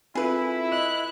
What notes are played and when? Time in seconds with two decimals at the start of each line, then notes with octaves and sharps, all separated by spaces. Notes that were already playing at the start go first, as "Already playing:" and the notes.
0.15 C4 E4 F4 G#4 A4 B4
0.72 D#5 F#6